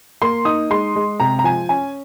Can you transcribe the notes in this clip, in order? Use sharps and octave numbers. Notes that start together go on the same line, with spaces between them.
A#3 C6
D#4 D#6
G#3 C6
G#3
C3 A#5
A#5
F3 G#5
C#4 G#5